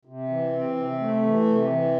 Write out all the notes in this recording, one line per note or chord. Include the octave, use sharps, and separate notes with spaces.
C3
E3
C4
C3
A3
E3
C3
E3